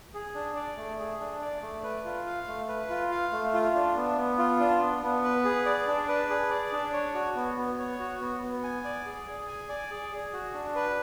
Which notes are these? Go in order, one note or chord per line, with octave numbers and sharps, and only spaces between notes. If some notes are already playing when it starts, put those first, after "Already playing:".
G#4
D4
D5
A3
G#4
D4
D5
A3
B4
F4
F5
A3
B4
F4
F5
A3
F4
D4
B3
B3
F4
D4
B3
B3
B4
G#4
D5
D4
B4
G#4
D5
D4
C#5
F#4
B3
B3
C#5
F#4
B3
B3
G#5
D5
G#4
G#4
G#5
D5
G#4
G#4
F#4
D4
B4